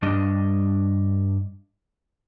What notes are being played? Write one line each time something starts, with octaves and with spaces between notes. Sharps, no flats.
G2 G3 D4 D#5